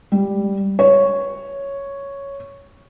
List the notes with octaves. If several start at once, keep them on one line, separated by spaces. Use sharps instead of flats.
G3
C#5